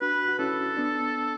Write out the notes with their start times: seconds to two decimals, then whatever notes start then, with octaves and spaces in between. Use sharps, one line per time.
0.01 D4 F#4 B4
0.28 F#4
0.39 C#4 E4 A4
0.77 B3 D4